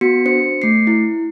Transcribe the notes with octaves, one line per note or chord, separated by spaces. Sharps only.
B3 F#4 C#7
D4 C5 C#7
A3 C7
E4